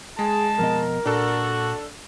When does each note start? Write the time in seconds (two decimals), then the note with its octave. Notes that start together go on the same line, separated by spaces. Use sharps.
0.19 G#3 G#4 A5
0.59 F2 B2 A#4 D#5
1.06 A#2 D4 F#4 A4